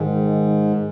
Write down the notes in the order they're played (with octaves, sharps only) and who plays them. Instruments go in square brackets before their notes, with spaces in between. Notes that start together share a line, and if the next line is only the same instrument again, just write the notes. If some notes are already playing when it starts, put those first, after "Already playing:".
Already playing: [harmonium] G#2 [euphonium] D#3